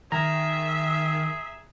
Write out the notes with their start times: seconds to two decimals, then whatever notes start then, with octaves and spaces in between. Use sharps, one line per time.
0.12 D#3 G#4 E5 A#5